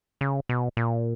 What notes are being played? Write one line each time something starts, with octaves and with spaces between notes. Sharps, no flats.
C#3
B2
A#2